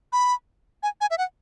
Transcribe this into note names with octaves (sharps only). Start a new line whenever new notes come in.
B5
G#5
G#5
E5
F#5